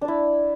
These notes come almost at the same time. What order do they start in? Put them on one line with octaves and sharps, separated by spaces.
D4 D5 E4